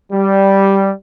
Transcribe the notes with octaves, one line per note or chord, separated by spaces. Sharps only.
G3